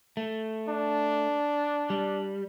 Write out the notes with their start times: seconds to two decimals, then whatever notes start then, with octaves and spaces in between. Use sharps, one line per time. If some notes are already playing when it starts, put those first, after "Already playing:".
0.17 A3
0.69 D4
1.90 G3